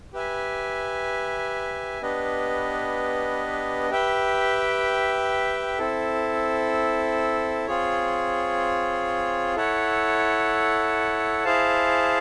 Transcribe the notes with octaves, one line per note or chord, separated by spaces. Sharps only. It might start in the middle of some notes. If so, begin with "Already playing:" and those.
G4 B4 E5 G#5
B3 D4 G4 B4 D#5
G4 B4 E5 G5
C4 E4 A4
C4 F4 G#4 C#5
E4 A4 C#5 F#5
E4 G#4 C5 F5 A5